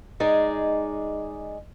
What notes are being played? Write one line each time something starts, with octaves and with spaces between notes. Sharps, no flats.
G#3 D#4 G#4 D5